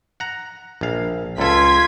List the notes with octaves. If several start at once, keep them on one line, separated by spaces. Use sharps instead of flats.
F#5 A#5
A#1 F5
C#2 F4 A4 G#6 B6